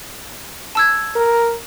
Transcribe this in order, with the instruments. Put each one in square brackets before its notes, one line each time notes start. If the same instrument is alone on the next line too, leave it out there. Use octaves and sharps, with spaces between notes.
[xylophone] A5 E6 G#6
[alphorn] A#4